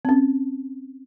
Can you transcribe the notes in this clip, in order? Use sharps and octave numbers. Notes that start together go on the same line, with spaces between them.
C4 C#4